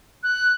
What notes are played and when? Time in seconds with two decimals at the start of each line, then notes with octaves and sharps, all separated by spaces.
0.23 F#6